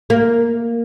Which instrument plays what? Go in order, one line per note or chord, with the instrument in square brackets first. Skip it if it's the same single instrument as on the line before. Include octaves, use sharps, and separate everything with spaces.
[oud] A#3